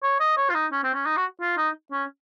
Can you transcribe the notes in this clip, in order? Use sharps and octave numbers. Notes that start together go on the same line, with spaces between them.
C#5
D#5
C#5
F4
D#4
C#4
C4
C#4
D#4
F#4
F4
D#4
C#4